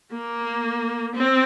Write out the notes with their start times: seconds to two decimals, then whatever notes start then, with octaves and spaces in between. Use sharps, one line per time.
0.12 A#3
1.15 C4